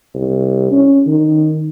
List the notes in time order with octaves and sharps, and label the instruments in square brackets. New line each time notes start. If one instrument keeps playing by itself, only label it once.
[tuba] C2
C#4
D#3